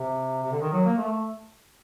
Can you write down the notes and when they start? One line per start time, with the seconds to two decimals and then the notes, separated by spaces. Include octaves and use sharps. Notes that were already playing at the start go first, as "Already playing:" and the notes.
Already playing: C3
0.43 C3
0.52 D3
0.61 D#3
0.73 F#3
0.85 A#3
0.97 A3